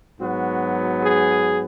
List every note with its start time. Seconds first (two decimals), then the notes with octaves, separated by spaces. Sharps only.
0.21 G#2 F#3 B3 F#4
1.03 G#4